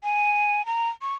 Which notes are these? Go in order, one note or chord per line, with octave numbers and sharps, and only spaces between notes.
G#5
A#5
C#6